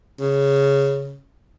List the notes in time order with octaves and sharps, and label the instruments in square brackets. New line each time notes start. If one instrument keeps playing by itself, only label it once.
[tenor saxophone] C#3